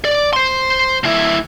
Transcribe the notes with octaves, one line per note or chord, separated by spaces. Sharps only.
D5
C5 C6
D2 E4